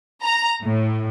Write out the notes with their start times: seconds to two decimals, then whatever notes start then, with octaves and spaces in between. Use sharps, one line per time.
0.22 A#5
0.62 A2